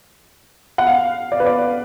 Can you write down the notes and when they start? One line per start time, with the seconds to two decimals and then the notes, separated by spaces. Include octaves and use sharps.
0.78 F#5
0.87 F5
1.32 D5
1.40 B4
1.46 D5